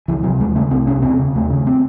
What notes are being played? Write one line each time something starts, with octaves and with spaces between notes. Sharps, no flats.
C#2 E3
C3 F#3
D#2 G#3
C#3 A3
C2 C4
C3 C#4
E2 C4
C#3
D#2 A3
C#3
C4